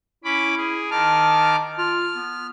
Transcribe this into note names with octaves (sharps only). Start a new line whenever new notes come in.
C#4 E4 B5 D6
G#4
D#3 A5 D6 F6
F4 F6
B3